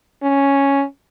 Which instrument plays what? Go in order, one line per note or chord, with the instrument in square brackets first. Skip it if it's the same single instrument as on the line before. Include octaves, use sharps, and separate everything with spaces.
[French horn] C#4